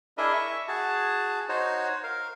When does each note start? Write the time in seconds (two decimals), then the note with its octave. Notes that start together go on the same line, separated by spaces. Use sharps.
0.18 D4 E4 G#4 A#4 D#5 E5
0.34 E5 C#6
0.68 F#4 G#4 A5
1.49 D#4 F#4 C5 C#5
2.03 A#4 F5